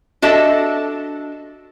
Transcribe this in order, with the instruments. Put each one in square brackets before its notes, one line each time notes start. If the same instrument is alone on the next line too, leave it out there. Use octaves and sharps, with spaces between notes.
[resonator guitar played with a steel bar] D4 F#4 A4 D#5 E5